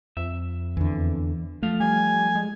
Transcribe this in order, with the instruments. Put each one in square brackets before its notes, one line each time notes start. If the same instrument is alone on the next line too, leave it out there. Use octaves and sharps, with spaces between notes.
[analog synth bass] F2 [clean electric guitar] E5
[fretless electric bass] E2 D3 [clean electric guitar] E3
[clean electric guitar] F3 F5 [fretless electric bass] A3
[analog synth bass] G3 [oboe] G#5
[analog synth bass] G#3